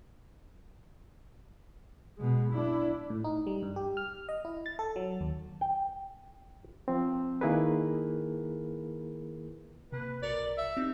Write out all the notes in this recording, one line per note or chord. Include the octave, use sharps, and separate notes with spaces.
B2 G#3
D4 E4
A2
D#4
G3
G2
G4
F6
D#5
E4
A6
A4
F#3
D#2
G5
F3 C4
D#3 A#3 E4 G#4 A#4 B4
C3 A#3 B4
B1 A#4 D5 C#7
E5
C4 D#4 G4